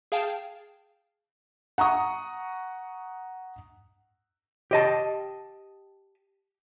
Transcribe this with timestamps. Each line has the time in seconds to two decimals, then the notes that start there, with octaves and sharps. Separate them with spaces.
0.12 G#4 F5 G5 A5
1.78 F#5 A#5 C#6 D#6
4.71 G4 D#5 A5